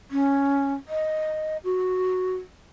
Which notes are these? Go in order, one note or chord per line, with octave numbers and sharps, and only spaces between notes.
C#4
D#5
F#4